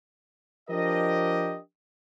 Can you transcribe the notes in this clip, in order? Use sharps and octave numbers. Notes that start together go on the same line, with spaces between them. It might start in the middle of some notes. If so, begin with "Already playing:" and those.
F3 D4 G4 A#4 D#5